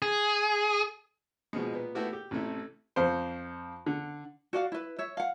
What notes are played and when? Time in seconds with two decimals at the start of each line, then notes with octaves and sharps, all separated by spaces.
0.02 G#4
1.53 B2 F3 G#3
1.73 A#2 B3
1.95 A3 B3 E4 F#4 G4
2.13 G4
2.31 A1 C3 A3 E4
2.96 F2 C5
3.86 D3
4.53 F#4 D5 F5 F#5
4.72 E4 B4
4.99 C#5 E5
5.17 F5 F#5